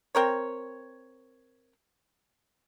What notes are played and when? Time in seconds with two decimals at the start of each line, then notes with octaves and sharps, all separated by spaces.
0.15 C4 A#4 C#5